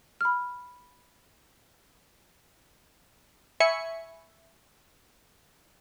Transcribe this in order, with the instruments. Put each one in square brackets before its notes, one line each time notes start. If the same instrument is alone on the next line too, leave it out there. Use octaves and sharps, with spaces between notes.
[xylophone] B5 F6
[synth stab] E5 G#5 B5 C#6 C#7